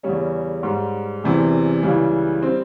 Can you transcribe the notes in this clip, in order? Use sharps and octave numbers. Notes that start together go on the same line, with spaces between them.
E2 C#3 G3 C#4
G#2 G3
E2 C3 E3 G3
C#2 C#3 E3 G3
G3 C4